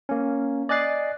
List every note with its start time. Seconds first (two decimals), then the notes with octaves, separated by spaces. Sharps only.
0.09 A#3 C#4
0.69 D5 D#5 G#5 F#6 A6 C7